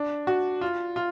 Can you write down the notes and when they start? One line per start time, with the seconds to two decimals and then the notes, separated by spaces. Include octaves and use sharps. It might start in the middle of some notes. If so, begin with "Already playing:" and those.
Already playing: D4
0.27 F#4
0.61 F4
0.96 F4